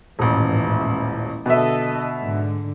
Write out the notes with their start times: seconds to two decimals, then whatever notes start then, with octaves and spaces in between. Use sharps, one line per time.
0.19 D#1 A1 G#2 E3 E4
1.46 B2 D3 A4 D#5 E5
2.22 G#2 D3